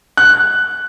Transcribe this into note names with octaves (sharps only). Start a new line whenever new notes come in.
F#6